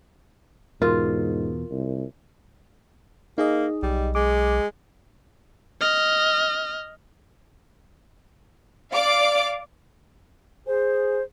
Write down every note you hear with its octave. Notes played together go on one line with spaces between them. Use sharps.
E2 G#2 B2 F4 A#4
C2
A#3 D#4 G#4 D#5
B1 G3
G#3 D6
D#5 F6
D5 F5 D6
G#4 C5